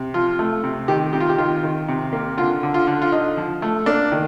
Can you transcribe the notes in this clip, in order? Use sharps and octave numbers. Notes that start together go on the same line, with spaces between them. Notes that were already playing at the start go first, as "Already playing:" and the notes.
Already playing: C3
F3 F4
A3
C3
D#3 G4
C3 G4
F4
G4
D#3 F4
D#3
C3
A#3
D3 F4
D3
F4
D3
F4
D3 D#4
F3
A3
A#3 D4
D#3